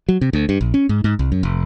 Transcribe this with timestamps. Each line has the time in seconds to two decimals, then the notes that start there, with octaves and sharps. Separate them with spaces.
0.09 F#3
0.21 C3
0.33 D2
0.49 G2
0.61 A#1
0.74 C#4
0.89 G#2
1.04 G#2
1.19 C2
1.32 F#2
1.43 F1